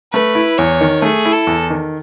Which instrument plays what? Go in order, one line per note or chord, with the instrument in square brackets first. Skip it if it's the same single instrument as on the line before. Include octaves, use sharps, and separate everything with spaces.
[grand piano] A3 [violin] B4
[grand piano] E4
[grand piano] E2 [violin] C#5
[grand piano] D#3
[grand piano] A3 [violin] G#4
[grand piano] E4
[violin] A4
[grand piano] E2
D#3